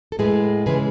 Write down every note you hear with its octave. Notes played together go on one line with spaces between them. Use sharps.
A4
A2 G#3 G#4 B4
C#3 E3 G#3 G#4 B4